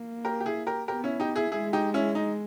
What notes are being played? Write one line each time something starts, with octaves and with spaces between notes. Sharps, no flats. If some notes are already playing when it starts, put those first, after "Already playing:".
Already playing: A#3
G4 A#4
G4
E4 G#4
G4 A#4
B3 G4 A#4
C#4 E4
D#4 G4
E4 G#4
G#3 E4 G#4
D#4 G4
C#4 E4
D#4